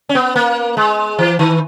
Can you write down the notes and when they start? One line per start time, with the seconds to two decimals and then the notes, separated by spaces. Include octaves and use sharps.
0.09 C#4
0.15 B3
0.36 A#3
0.77 G#3
1.18 E3
1.39 D#3